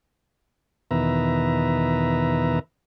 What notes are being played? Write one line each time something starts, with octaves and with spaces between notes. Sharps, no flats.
E2 B2 D#3 B4 E5 A#5